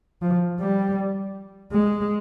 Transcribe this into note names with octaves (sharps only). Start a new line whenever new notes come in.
F3
G3
G#3